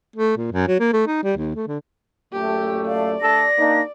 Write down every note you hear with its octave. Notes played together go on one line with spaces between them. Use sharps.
A3
A#2
F#2
F#3
A#3
A3
D#4
G3
D#2
A3
D3
F#2 A#2 A3 G4
D5 F5
A3 D4 A4 A#6
A#3 D4 D#4